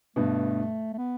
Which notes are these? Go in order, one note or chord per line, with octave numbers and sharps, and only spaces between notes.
G2 B2 A3
A3
B3